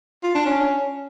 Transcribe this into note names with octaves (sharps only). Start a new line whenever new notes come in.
F4
D4
C#4